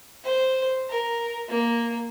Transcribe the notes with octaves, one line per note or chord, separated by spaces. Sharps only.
C5
A#4
A#3